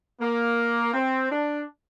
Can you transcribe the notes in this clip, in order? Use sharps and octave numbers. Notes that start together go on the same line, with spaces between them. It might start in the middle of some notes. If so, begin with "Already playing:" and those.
A#3
C4
D4